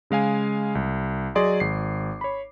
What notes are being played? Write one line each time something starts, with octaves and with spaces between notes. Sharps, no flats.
C#3 G#3 F5 G#5
C2
F#3 G#4 D5 D#5 C6 D6
G#1 C7
C#5 B5